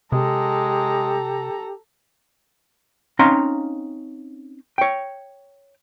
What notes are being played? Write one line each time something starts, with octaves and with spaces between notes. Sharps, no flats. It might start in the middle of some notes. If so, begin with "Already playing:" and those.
C3 G#3 G4 A4 A#5
C4 C#4 D#4 F5 A#5 C6
C#5 G5